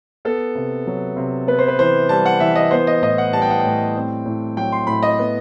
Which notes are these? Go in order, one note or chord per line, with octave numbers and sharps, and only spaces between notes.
B3 A4
C3
F#3
C3
B3 B4
C5
B4
E3 C5
G3 A5
F#5
E3 E5
D#5
B3 C5
D#5
A2 D#5
F#5
G3 A5
G5
F#5
A2 G5
C4
A2
F#3 G5
C6
A2 B5
D#5
B3